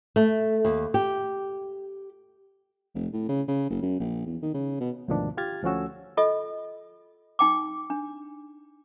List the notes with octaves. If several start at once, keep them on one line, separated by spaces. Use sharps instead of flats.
A3
D#2
G4
F1
A2
C#3
C#3
F#1
F#2
A#1
E2
D#3
C#3
B2
D2 G#2 B2 D#3 F3 D4
F4 G4 F6 G#6 A6
D2 F3 A3 C#4 F#4 E6
F4 A4 D#5
D#4 G5 D6
D4